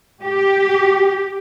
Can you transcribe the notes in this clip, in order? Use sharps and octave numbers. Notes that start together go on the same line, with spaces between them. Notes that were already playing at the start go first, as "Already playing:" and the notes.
G4